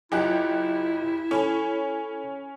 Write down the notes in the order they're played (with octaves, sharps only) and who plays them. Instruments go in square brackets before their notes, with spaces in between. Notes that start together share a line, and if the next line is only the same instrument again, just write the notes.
[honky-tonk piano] F#1 G4 F#6 [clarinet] E4 [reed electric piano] F4 D#5 G5
[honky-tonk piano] C#4 [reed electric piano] A4 B5